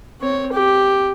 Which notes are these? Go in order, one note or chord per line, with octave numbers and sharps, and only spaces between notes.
C4 C#5
G4